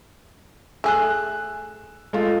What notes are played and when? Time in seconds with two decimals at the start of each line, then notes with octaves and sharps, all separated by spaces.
0.84 A3 G#4 E6 F#6
2.13 G#3 A3 F4